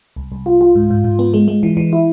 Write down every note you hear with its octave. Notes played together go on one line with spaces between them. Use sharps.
C2
C2
F4
F4
G#2
G#2
G#2
B3
G#3
G#3
E3
E3
E4